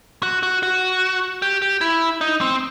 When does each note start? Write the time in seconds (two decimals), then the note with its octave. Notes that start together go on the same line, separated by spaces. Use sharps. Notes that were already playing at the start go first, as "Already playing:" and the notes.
0.23 F#4
0.43 F#4
0.63 F#4
1.42 G4
1.62 G4
1.81 E4
2.21 D#4
2.41 C4